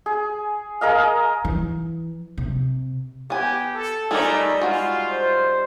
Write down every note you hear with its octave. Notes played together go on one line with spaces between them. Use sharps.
G#4
G#4 A#4 D#5 F5
E3
C3
B3 G4 G#5
A4
G3 A3 D#4 G#4 A#4 D5
G#3 F4 F#4
C5